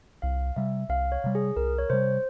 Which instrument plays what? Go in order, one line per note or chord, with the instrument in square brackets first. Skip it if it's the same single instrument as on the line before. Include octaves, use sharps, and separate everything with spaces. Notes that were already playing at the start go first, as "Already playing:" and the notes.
[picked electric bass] C2 [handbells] F5
[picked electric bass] C3 G3 [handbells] E5
[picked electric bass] C2 [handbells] F5
[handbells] C#5
[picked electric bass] C3 G3
[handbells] G#4
[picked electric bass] C2 [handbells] A#4
[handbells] C#5
[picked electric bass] C3 G3 [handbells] C5